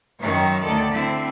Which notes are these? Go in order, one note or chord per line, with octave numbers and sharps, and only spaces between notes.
F#2 D#3 C#5
D2 D#3 A4 D5
D3 C4 E4